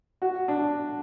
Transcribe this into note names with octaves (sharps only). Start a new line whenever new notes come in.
F#4
D4